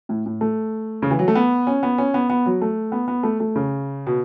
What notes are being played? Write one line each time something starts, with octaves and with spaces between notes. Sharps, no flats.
A2
A2
A3
C#3
E3
F#3
A3
B3
C#4
B3
C#4
B3
B3
F#3
A3
B3
B3
A3
A3
C#3
B2